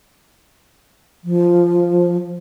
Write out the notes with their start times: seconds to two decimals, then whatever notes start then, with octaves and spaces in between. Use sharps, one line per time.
1.24 F3